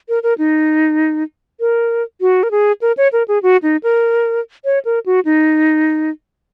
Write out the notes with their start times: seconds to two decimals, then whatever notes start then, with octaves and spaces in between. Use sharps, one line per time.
0.09 A#4
0.23 A#4
0.38 D#4
1.60 A#4
2.21 F#4
2.43 A#4
2.51 G#4
2.82 A#4
2.97 C#5
3.13 A#4
3.28 G#4
3.43 F#4
3.63 D#4
3.83 A#4
4.65 C#5
4.85 A#4
5.06 F#4
5.25 D#4